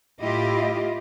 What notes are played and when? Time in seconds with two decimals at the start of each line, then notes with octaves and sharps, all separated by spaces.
0.19 A2 E4 F4 G4 D#5